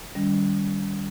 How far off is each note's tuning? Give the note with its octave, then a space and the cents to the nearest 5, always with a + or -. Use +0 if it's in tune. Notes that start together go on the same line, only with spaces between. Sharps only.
D#3 -25 G3 +0 C#4 +45